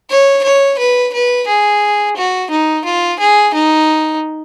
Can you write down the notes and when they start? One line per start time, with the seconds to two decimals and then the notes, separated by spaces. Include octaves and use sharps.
0.10 C#5
0.44 C#5
0.79 B4
1.14 B4
1.47 G#4
2.16 F#4
2.51 D#4
2.85 F4
3.20 G#4
3.54 D#4